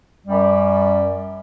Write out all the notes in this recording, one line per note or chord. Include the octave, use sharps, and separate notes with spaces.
F#2 G3